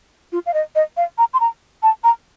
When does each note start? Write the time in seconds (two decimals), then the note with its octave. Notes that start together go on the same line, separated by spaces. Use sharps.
0.32 F4
0.46 F5
0.54 D#5
0.75 D#5
0.97 F5
1.18 A#5
1.34 C6
1.40 A#5
1.83 A5
2.04 A#5